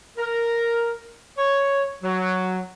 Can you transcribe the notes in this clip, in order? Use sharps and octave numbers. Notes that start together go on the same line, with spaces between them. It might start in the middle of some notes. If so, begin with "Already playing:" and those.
A#4
C#5
F#3